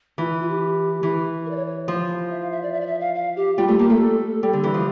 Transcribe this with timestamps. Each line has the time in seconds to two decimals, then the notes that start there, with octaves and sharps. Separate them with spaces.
0.18 E3 F4
0.29 E4
0.40 F4
0.50 G4
1.03 E3
1.45 A#4
1.50 D5
1.56 C#5
1.66 C#5
1.88 F3
2.30 E5
2.40 F5
2.52 E5
2.63 D5
2.73 E5
2.81 D5
2.86 E5
3.01 F5
3.15 F5
3.36 G4
3.57 G3 F4
3.68 A3 F4
3.79 A#3 G4
3.89 A3 A4
4.43 G3
4.53 D3
4.63 E3
4.74 F3